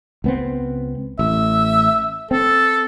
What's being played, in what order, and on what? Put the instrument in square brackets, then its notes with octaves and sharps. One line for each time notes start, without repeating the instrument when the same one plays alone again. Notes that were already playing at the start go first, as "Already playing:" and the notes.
[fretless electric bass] C#2 B3 C4
[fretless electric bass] A1 [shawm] E5
[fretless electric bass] C4 [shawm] A4